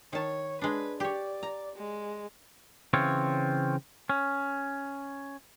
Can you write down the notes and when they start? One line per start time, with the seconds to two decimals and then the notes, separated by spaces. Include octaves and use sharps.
0.13 D#3 C#5 A5
0.62 G#3 D4 B4
1.00 G4 C#5 D5
1.43 A#5
1.76 G#3
2.94 C#3 E3 C4 F4 C#5
4.09 C#4